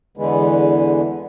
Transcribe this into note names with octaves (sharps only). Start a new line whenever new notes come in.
E2 D3 E3 G#3 B3